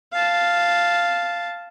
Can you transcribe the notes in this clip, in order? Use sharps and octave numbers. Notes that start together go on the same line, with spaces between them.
F5 A5